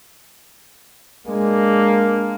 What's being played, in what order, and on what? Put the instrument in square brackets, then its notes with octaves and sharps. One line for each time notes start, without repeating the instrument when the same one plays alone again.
[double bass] G#3 D4 [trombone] A#3